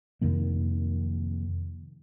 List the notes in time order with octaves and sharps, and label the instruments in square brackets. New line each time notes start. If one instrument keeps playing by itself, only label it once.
[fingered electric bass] F2 C3 D#3 A#3